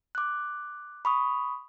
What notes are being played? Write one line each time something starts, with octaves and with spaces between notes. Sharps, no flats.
D6 F#6
B5 C#6 D#6